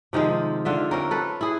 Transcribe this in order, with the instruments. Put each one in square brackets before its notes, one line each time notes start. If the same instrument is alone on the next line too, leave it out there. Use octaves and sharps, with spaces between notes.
[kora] C3 D#3 F3 G#3
D3 F4 E5
C4 C#4 A#4
A4 B4
E4 G#4